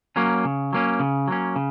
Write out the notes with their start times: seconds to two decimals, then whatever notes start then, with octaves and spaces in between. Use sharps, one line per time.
0.16 F#3 A#3 C#4
0.45 C#3
0.73 F#3 A#3 C#4
1.00 C#3
1.28 F#3 A#3 C#4
1.56 C#3